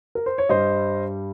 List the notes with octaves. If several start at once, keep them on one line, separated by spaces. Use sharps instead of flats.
A#4
C5
C#5
G2 G3 C5 D#5